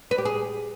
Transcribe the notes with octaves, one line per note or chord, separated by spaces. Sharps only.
B4
G4
G#4